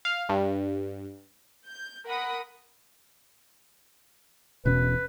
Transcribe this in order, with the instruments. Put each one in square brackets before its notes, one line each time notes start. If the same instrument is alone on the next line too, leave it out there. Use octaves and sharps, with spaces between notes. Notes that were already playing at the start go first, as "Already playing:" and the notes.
[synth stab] F5
G2
[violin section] G6
A#4 F#5 B5 D#6
[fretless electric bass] E1 B2 C#4 [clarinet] B4